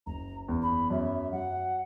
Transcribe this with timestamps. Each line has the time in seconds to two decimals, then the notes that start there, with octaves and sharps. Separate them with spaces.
0.06 F#1 A#5
0.48 E2
0.62 B5
0.90 F#2 E5
1.32 F#3 F#5